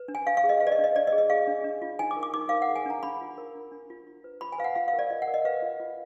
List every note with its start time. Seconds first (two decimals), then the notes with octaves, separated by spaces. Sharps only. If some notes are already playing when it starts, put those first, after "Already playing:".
Already playing: B4
0.08 D4
0.15 G#5
0.26 D4 F5
0.37 F5
0.44 G#4
0.49 D#5
0.60 B4 F5
0.67 D5
0.72 D#5
0.78 D4
0.84 D#5
0.95 D4 D5
1.07 D#5
1.12 G#4
1.18 D#5
1.30 G#4 F5
1.47 D4
1.64 D4
1.82 F4
1.99 D#4 G#5
2.11 D6
2.16 A#4
2.23 D6
2.34 D#4 D6
2.49 A#4 F5
2.62 F#5
2.68 G#4
2.76 G#5
2.86 D4 A#5
3.03 D4 B5
3.21 F4
3.38 A#4
3.55 D4
3.72 D4
3.90 F4
4.07 F4
4.24 B4
4.41 F4 B5
4.52 G#5
4.58 B4 F5
4.64 F#5
4.75 F4 F5
4.88 F5
4.93 A#4
4.99 D5
5.10 F4 D#5
5.22 F#5
5.27 A#4
5.34 D#5
5.45 B4 F5
5.62 F4
5.80 F4